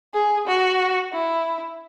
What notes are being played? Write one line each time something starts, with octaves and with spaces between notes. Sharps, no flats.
G#4
F#4
E4